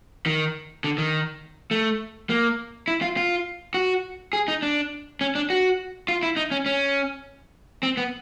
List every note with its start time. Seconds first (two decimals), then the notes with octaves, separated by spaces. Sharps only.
0.26 D#3
0.84 D3
0.98 D#3
1.71 A3
2.30 A#3
2.88 E4
3.02 F4
3.17 F4
3.74 F#4
4.33 G#4
4.48 D#4
4.62 D4
5.21 C#4
5.35 D4
5.50 F#4
6.08 F4
6.23 E4
6.37 D#4
6.51 C#4
6.66 C#4
7.83 C4
7.97 B3